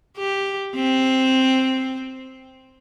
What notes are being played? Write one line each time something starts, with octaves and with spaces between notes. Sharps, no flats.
G4
C4